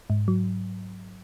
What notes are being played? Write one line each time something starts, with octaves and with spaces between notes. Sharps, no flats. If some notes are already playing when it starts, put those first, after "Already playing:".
G#2
F#3